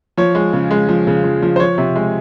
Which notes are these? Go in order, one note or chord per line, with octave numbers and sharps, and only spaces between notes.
F3 C#5
G#3
C#3
G#3
F3
C#3
F3
F3
C5
F3 C#5
C3
G#3